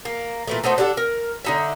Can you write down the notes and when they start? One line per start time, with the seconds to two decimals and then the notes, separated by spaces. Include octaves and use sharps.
0.05 A#3
0.47 A#2 E3 A3
0.64 A3 D#4 F#4 C5
0.78 D4 G4 A4 F#5
0.97 A#4
1.45 D3 D#4 E5